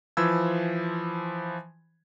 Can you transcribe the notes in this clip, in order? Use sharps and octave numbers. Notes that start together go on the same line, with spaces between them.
E3 F3 C5 B5 E6 G#6